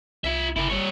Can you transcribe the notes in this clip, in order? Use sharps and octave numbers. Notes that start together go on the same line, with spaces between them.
C2 F4 E5
G1 E4 A#4
G3 C#5